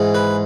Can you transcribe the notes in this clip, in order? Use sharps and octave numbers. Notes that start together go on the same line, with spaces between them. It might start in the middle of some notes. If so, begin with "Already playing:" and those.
Already playing: G#2 E3 G#3
B4